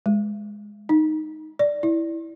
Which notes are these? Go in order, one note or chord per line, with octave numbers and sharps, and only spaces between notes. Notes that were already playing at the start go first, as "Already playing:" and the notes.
G#3
D#4
D5
E4